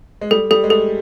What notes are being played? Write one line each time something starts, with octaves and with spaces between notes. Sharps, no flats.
G#3
G3 A4
G3 A4
G#3
A3 A4